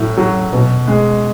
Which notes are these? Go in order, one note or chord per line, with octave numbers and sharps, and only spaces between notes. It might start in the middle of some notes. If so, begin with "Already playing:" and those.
Already playing: A2 F#3
F#3
B2
G#3